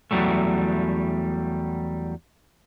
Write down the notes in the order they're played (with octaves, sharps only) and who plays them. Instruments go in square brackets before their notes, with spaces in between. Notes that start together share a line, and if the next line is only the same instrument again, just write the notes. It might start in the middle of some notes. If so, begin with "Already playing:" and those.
[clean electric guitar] E2 F#3 G3 A3